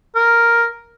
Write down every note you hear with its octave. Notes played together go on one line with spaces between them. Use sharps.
A#4